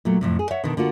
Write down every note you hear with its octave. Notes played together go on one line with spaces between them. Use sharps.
A#2 F#3 A3
F2 A2 C3
G#4
C#5 E5 F#5
B2 D3 D#3
D3 A#3 F4 F#4